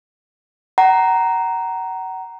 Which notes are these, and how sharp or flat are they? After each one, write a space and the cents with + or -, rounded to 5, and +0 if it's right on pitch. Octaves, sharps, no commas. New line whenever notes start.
F#5 +35 A#5 +0